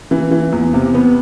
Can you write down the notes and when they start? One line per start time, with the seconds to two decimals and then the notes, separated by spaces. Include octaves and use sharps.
0.11 E3
0.31 E3
0.53 E2
0.73 C3
0.94 B3